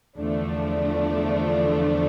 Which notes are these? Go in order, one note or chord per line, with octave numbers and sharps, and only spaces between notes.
E2 D3 F3 A3 D4